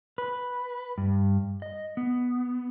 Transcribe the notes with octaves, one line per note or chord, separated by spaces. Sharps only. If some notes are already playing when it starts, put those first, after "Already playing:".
B4
G2
D#5
B3